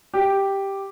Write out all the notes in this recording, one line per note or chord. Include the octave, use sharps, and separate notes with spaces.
G4